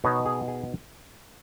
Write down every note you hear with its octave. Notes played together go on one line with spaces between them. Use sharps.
B2 B3 D#4 C#5
G#4
G#4